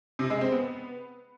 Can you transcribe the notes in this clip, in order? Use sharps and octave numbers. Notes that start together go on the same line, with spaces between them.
C3
G#3
C4
B3